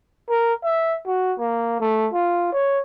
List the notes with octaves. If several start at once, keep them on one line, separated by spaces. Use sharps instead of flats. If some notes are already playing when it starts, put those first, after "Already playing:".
A#4
E5
F#4
A#3
A3
F4
C#5